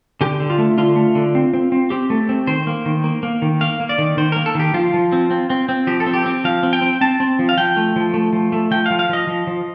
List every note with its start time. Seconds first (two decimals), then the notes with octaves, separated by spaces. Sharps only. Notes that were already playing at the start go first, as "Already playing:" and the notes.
0.21 D3 G4
0.40 D3
0.50 F4
0.58 A3
0.78 D3 F4
0.96 A3
1.15 D3
1.35 C4
1.53 C4
1.72 C4
1.90 C4 G4
2.10 A3
2.29 C4
2.47 D#3 C5
2.67 A#3
2.86 D#3
3.04 A#3
3.23 A#3
3.42 D#3
3.61 A#3 F5
3.80 A#3
3.89 D5
3.98 D#3
4.17 D#3 C5
4.32 A#3 A#4
4.46 A4
4.55 D#3 G4
4.74 F3 F4
4.94 F3
5.12 C4
5.31 C4
5.50 C4
5.69 C4
5.87 F3 G4
6.00 A4
6.07 C4
6.13 G4
6.26 C4
6.45 F3 F5
6.63 C4
6.73 G5
6.82 C4
7.01 C4 A5
7.20 C4
7.39 F3
7.49 F5
7.57 F3 G5
7.77 A3
7.96 F3
8.14 A3
8.33 F3
8.52 A3
8.71 F3 G5
8.86 F5
8.91 F3
8.99 F5
9.09 F3 D#5
9.27 F3
9.47 F3